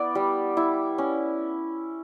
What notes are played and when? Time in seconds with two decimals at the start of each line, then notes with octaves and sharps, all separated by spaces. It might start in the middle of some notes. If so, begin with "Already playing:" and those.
Already playing: B3 E4 D5
0.15 G3
0.57 E4
0.98 C#4